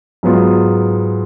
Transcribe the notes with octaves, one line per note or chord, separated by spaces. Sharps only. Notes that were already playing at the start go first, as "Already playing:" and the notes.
G#2 F#3 B3 F4